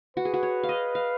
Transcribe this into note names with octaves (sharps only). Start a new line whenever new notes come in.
F#4 B4
G#4
F#4
C#5
F5
D#5
F5